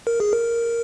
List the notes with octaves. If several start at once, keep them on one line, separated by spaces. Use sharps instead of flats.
A#4
G#4
A#4